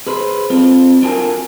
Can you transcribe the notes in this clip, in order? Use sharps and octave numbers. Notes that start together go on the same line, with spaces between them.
G#4 B4 C5
C4 F4 A4
D4 F4 F#4 A4 A#4 G#5